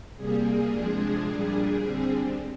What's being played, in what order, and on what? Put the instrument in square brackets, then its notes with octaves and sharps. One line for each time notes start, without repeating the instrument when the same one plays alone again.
[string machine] C3 G3 A#3 G#4
C3 F3 G#3 D4
A#2 G3 D4
D3 G3 C4